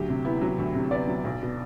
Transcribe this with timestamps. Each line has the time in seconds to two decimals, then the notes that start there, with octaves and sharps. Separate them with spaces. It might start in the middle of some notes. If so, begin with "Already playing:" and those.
Already playing: D2 F#3 G4
0.09 C3
0.25 B3 E4
0.41 F#3
0.58 D2
0.75 C3
0.91 B3 D5
1.07 F#3
1.24 B1
1.42 B2